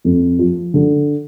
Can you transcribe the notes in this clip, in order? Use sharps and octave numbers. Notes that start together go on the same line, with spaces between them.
F2
F3
D3